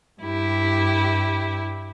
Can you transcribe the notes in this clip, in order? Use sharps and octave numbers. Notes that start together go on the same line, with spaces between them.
G2 E4 G4